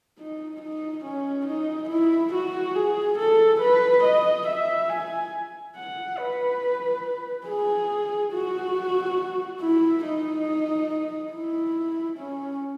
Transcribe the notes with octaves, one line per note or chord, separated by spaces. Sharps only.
D#4
D#4
C#4
D#4
E4
F#4
G#4
A4
B4
D#5
E5
G#5
F#5
B4
G#4
F#4
E4
D#4
E4
C#4